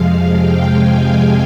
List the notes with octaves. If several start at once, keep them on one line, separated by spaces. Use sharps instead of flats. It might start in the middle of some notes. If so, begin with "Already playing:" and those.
Already playing: F2 C3 F3 G#3 F5
G5
G#5